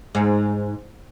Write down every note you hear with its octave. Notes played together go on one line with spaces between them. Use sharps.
G#2